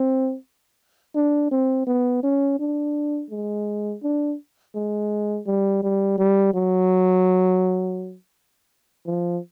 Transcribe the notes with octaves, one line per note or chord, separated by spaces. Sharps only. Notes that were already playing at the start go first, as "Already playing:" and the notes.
Already playing: C4
D4
C4
B3
C#4
D4
G#3
D4
G#3
G3
G3
G3
F#3
F3